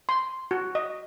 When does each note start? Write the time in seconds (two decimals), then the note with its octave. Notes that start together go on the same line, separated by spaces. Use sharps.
0.09 C6
0.51 F#4
0.75 D#5